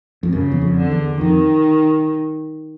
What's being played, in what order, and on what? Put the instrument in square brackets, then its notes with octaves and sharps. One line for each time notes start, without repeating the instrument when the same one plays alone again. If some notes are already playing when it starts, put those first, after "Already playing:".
[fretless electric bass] F2
[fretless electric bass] F#2 [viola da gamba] C#3
[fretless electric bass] E2
F2
[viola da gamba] D3
[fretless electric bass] E2
[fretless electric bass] F2 [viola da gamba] D#3